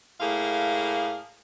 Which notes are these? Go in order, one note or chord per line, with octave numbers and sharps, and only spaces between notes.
A2 A#3 G#4 F5